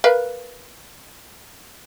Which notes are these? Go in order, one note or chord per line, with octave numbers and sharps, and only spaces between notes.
A#4 B4 F5